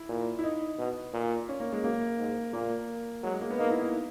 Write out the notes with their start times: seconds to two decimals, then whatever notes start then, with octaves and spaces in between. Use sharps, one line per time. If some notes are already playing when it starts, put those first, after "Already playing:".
Already playing: E4
0.09 A#2
0.39 E4
0.43 D#4
0.79 B2
1.13 A#2
1.49 C#4
1.60 A#3
1.72 G#3
1.83 F#2 A#3
2.19 G#2
2.53 A#2 A#3
3.23 F#3 G#3
3.33 G#3
3.41 A#3
3.50 B3
3.58 A#3 D#4
3.70 E4
3.82 D#4